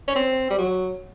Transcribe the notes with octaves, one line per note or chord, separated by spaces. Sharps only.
C#4
C4
G3
F#3